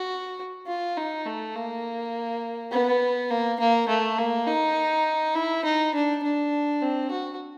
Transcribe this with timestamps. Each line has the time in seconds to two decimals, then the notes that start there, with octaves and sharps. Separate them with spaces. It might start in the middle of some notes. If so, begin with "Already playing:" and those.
Already playing: F#4
0.67 F4
0.97 D#4
1.26 A3
1.55 A#3
2.72 B3
3.30 A#3
3.60 A#3
3.89 A3
4.18 A#3
4.47 D#4
5.35 E4
5.64 D#4
5.94 D4
6.23 D4
6.82 C4
7.11 F#4